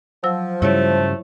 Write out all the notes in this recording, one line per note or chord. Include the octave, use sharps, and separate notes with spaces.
F3 F#3 E6
G2 C#3 G3 A3 E4 C#5